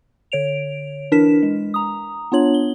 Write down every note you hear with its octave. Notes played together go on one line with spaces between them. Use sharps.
D3 C#5 D7 F7
E3 D4 E4 A#4 B6 E7
G#3
A#5 D#6
B3 D4 F4 C#5 F#7
G7